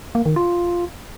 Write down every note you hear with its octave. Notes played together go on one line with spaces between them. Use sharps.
A#3
D#3
F4